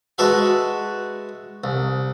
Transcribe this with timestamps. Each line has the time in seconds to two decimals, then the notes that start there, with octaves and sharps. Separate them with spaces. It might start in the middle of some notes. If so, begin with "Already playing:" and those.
0.18 G#3 F#4 A4 B4 E5 F5
1.64 C2